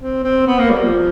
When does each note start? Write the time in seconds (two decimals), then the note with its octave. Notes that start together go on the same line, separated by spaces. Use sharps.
0.01 C4
0.24 C4
0.47 B3
0.59 A#3
0.70 G3
0.83 F3